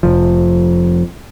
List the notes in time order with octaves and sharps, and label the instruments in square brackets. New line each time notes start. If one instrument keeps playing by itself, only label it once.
[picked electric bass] F1 F3